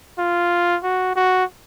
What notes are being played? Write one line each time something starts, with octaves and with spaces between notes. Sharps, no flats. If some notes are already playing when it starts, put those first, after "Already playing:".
F4
F#4
F#4